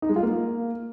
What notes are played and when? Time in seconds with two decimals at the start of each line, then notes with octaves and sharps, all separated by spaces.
0.02 D#4
0.09 G#3
0.16 F4
0.23 A#3